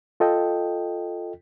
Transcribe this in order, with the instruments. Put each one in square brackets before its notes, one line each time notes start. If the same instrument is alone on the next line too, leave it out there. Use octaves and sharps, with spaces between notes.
[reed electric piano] F4 A4 D#5 G5